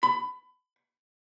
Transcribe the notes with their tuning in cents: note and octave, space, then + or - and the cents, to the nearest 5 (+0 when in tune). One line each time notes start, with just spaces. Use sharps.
B5 +25